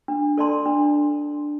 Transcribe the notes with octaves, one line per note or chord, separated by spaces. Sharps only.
D4
A4 D5 A5 C6
D4